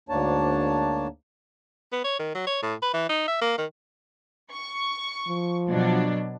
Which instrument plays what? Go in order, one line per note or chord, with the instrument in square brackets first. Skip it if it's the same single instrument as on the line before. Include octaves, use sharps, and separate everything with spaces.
[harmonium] D2 G#2 A#3 D4 C#5 A5
[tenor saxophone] B3
C#5
D#3
F#3
C#5
A2
B4
E3
D#4
E5
A#3
D#3
[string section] C#6
[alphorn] F3
[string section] B2 F#3 D4